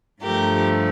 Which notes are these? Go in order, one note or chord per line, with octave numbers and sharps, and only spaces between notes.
G2 F3 A3 G4 A#4